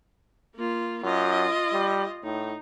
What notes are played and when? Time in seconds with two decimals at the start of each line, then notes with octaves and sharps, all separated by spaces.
0.55 A#3 F4
1.03 F#2 F4 D#5
1.73 G3
2.23 A2 D#4